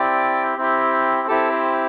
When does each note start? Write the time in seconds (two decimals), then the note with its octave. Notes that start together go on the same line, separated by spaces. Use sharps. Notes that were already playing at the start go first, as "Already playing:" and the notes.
Already playing: C4 E4 G4 D5 G5
0.58 C4 E4 G4
1.28 C4 E4 G4 A4
1.52 C5